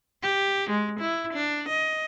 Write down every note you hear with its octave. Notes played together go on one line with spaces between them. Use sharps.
G4
G#3
E4
D4
D#5